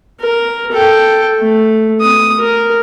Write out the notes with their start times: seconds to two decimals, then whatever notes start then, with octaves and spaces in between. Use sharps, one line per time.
0.20 A#4
0.71 A4 G5
1.39 A3
2.01 D#6
2.39 A#4